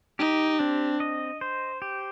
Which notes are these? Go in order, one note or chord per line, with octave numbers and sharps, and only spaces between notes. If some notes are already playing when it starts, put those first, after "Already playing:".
D#4 G4
C4 D4
D#5
C5
G4